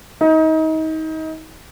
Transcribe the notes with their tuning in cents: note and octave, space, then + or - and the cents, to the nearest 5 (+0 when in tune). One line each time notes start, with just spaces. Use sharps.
D#4 +30